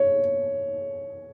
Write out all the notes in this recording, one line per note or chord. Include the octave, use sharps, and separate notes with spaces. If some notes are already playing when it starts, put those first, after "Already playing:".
Already playing: C#5